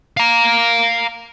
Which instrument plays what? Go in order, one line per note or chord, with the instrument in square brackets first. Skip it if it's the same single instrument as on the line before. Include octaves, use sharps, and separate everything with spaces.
[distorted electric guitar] F5 A#5